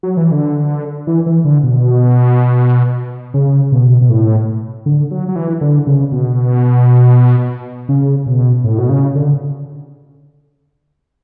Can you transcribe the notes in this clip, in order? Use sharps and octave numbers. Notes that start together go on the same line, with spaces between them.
F#3
E3
D3
E3
E3
D3
B2
C#3
B2
B2
A2
D3
F#3
F#3
E3
D3
C#3
B2
C#3
B2
A2
B2
C#3
D3